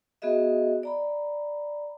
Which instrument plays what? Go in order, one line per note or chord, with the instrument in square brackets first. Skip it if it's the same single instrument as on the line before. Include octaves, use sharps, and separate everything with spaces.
[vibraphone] B3 F#4 G#4 D#5 E5
D5 A#5 B5